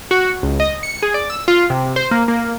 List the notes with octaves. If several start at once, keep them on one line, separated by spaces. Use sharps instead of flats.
F#4
C#2
D#5
C#7
G#4
D5
E6
F4
C3
C5
A#3
A#3